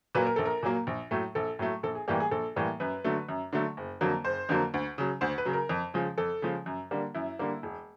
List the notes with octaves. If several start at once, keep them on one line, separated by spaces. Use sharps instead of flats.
A#2 F#3 A#3 B4
A#4
A#1 A4
A#4
A#2 F#3 A#3
A#1
A2 F#3 A3
A#1 A4
A2 F#3 A3
A#1 A4
G#4
A2 E3 G3 A#3 G4
G#4
A#1 A4
A2 E3 G3 A#3
F#2 B4
D3 F#3 A3
F#2
D3 F#3 A3
F#1
F2 D3 F#3 A#3
F#1 C5
F2 D3 F#3 A#3
D2
C#3 F#3
D2 C5
B4
C#3 F#3
A#4
F2
C#3 F3 G#3
F2 A4
C#3 F3 G#3
F#2
D3 G3 A#3
F#2 E4
D3 G3 A#3
E1